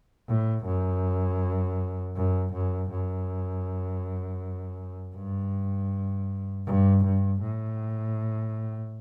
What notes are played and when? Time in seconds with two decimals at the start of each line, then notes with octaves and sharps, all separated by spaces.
0.28 A2
0.66 F#2
2.16 F#2
2.53 F#2
2.91 F#2
5.16 G2
6.66 G2
7.04 G2
7.41 A2